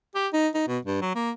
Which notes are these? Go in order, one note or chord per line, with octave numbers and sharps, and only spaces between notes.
G4
D#4
D#4
B2
G2
F#3
A#3